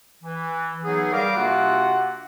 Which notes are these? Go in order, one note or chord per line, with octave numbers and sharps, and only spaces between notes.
E3
E3 F#3 B3 D#4 G#4
G3 A#4 F5 D6
C3 A#3 D4 F4 F#4 F#5